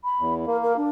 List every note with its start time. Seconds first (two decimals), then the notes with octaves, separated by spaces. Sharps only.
0.04 B5
0.20 E2
0.47 A#3 A#4
0.63 A#4
0.77 D4